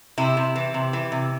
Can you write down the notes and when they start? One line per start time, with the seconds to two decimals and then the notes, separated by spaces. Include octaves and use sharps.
0.18 C3 E4
0.37 C3
0.56 E3
0.74 C3
0.93 E3
1.12 C3